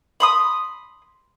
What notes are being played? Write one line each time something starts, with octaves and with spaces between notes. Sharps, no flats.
B5 C6 D#6